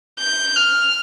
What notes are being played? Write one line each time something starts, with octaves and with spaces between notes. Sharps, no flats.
G6
F6